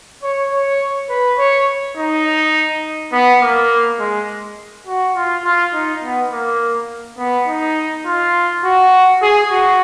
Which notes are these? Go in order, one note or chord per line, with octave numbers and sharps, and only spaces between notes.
C#5
C#5
B4
C#5
D#4
B3
A#3
G#3
F#4
F4
F4
D#4
B3
A#3
B3
D#4
F4
F#4
G#4
F#4